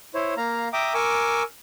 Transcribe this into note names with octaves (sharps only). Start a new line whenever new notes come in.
E4 C5 C#5
A#3 F5 A#5
E5 G5 A#5 D6 D#6
A#4 G#5 C#6 D6 E6